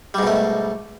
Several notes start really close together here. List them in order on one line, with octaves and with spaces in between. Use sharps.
G3 G#2 B2 A3